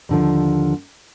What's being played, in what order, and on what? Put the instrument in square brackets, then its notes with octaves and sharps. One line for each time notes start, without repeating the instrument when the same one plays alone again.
[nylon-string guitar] D#2 D3 F3